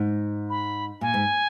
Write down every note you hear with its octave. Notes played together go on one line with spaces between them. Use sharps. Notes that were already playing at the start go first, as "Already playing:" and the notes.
Already playing: G#2
B5
A#2 G#5
G#2